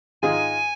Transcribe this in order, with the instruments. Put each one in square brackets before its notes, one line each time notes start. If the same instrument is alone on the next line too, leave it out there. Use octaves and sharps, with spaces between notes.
[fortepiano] G#2 D#3 G#3 F4 G#4 [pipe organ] G#5